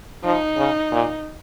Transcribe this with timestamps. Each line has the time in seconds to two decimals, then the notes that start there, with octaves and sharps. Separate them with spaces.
0.24 F3 D#4
0.57 C#3
0.92 A#2